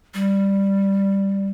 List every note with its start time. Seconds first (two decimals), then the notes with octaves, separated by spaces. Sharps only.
0.14 G3